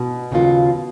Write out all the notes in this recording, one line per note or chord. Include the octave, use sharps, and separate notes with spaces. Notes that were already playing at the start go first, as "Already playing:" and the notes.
Already playing: B2
D#2 C#3 F#3 A#3 F4